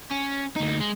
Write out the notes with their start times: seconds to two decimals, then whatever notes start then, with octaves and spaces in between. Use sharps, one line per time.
0.11 C#4
0.56 D2 D#4
0.80 G#3